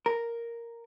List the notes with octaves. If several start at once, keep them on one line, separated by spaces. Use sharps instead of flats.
A#4